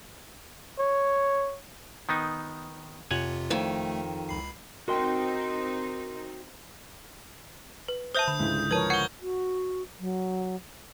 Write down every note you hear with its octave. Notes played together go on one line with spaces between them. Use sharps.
C#5
D#3 B3 D#4
F2 C3 F4 C#5 F#5 G#5
F2 D#3 A3
C#2 B5 C7
C4 D#4 F#4 A#4 D#5 G5 C6
B4
C5 E5 A5 D#6 G6
D3 B5
C#2 G#2 E4
F3 A#4 B4 C#5 A5 G#6
F#5 C#6 G#6 C#7 G7
F#4
F#3